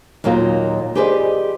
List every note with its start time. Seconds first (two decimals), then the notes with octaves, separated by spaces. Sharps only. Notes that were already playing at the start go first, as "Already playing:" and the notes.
0.24 D#2 A#2 F#3 A#3 D#4
0.95 G4 G#4 B4 C5 D5 D#5